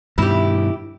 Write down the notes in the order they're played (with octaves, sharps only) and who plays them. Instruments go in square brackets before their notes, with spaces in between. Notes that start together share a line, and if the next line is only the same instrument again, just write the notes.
[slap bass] G2 B2 D#3 [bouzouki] E4 G4